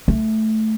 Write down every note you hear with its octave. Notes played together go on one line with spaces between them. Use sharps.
A3